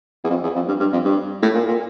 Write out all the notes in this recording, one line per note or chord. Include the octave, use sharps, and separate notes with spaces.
E2
F2
E2
F2
G2
G2
F2
G2
A2
A#2
A#2